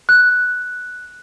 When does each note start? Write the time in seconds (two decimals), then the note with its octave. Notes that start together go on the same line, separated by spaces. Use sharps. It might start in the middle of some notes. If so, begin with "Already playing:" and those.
0.09 F#6